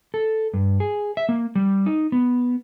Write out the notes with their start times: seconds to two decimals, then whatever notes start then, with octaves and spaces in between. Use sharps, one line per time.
0.14 A4
0.54 G2
0.80 G#4
1.17 E5
1.29 A#3
1.55 G3
1.86 D#4
2.12 B3